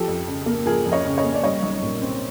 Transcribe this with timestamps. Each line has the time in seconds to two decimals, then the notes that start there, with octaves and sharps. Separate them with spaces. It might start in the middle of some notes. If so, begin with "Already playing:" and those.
Already playing: F3 G4 A4
0.08 F2
0.28 C#3
0.46 A#3
0.66 F3 G#4 A#4
0.86 F2
0.92 C#5 D#5
1.05 C#3
1.18 C#5 D#5
1.24 A#3
1.34 D5
1.43 G3 C#5 D#5
1.63 B1
1.82 A#2
2.02 C4